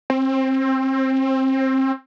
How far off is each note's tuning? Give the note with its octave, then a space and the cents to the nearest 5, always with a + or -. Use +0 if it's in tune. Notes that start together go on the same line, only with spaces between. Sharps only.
C4 +25